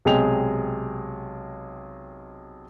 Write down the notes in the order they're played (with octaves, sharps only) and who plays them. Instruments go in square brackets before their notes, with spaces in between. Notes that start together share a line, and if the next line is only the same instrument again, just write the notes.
[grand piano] B1 C3 G#3 G#4 G5 F7